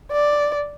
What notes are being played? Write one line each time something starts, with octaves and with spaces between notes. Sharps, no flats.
D5